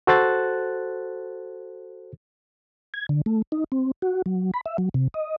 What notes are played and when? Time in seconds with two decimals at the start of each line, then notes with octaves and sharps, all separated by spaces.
0.07 F#4 A4 C5 F#6 A6
2.94 G#6
3.09 D3
3.26 A3
3.52 D#4
3.72 C4
4.02 F#4
4.26 F#3
4.54 B5
4.66 E5
4.78 F#3
4.94 C3
5.14 D#5